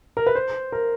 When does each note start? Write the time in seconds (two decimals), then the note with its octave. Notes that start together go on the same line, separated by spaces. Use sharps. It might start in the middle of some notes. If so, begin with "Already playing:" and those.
0.17 A#4
0.27 B4
0.35 C5
0.72 A#4